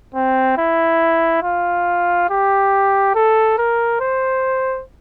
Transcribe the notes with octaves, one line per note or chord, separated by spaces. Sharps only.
C4
E4
F4
G4
A4
A#4
C5